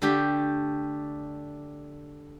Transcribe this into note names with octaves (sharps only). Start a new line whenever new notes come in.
D3 A3 G4 G5